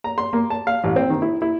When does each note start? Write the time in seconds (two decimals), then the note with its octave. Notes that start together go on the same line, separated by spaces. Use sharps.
0.04 A#5
0.18 C6
0.33 A#3
0.50 A5
0.67 F5
0.84 A1
0.96 C4
1.10 D#3
1.22 E4
1.42 E4